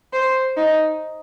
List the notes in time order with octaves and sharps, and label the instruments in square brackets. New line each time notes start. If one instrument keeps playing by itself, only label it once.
[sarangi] C5
D#4